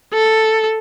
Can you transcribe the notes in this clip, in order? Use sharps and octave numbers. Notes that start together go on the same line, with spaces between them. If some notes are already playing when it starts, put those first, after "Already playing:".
A4